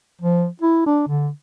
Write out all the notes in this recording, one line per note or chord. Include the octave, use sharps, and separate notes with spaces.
F3
E4
D4
D3